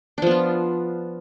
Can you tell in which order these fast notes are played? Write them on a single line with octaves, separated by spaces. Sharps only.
D4 F3 B3 F4